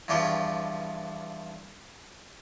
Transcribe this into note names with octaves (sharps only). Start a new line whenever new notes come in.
E2 G2 F3 G4 C#5 G5